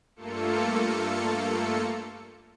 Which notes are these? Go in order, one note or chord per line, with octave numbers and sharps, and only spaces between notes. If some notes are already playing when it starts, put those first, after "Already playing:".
G2 A3 A#3 F4 A4 C#7